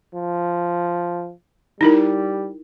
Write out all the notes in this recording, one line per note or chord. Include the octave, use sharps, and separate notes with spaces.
F3
G3 D#4 E4 A#4